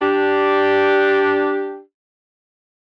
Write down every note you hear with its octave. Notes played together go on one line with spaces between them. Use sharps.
D4 G4